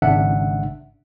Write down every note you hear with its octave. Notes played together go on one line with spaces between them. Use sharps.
G#1 C#3 D4 E5 F#5